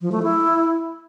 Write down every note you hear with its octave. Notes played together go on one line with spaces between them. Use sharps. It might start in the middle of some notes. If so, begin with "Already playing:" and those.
F3
A3
E4